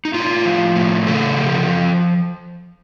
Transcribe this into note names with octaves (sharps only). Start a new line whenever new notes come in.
D#4
A2 F4
F3
A2
C#3 A4
F3